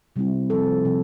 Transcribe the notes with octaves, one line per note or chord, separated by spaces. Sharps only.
C3 G3 C4 E4
C3 F3 C4 A4
C3 F3 C4